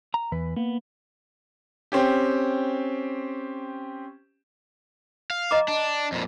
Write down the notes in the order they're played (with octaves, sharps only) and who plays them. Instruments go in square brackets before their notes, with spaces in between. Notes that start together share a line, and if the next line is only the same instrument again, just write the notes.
[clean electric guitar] A#5
[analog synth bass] E2 [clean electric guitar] E3 B4
[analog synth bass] A#3 [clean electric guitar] B3
[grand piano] C4 C#4 G4
[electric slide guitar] F5
[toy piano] D#5 A#5 D6
[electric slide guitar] D4
F2 A#2